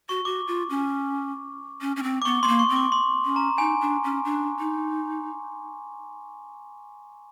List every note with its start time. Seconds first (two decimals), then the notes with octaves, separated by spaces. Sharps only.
0.09 F#4 C#6
0.25 F#4 D6
0.48 F4
0.70 C#4
1.81 C#4
1.96 C#4
2.03 C4
2.22 D6
2.25 B3 C#6
2.43 B3 C6
2.47 A#3
2.59 C#6
2.70 C4
2.76 D6
2.92 C6
3.25 C#4
3.36 A#5
3.58 D#4 G#5
3.81 D4
4.04 C#4
4.25 D4
4.59 D#4